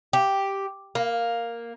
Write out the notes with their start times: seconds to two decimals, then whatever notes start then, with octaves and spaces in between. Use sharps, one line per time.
0.13 G4
0.95 A#3